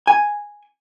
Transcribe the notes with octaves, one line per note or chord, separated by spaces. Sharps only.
G#5